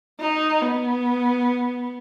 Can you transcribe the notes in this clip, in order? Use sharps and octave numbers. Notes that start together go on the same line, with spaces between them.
D#4
B3